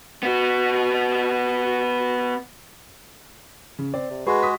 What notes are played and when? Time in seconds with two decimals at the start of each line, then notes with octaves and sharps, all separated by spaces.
0.23 B3 F#4
3.79 C#3
3.94 C4 D5
4.10 C3
4.27 G#3 F#4 G#4 B4
4.43 D#6 B6